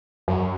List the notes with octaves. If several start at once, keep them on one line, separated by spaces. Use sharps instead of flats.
F#2